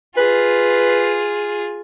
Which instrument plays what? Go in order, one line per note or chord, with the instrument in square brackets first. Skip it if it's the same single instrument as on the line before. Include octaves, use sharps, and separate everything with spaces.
[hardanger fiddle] F4 G#4 [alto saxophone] B4